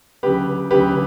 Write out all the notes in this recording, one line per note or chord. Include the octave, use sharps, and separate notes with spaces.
D2 C#3 F#3 G4 B4
D2 C#3 F#3 G4 B4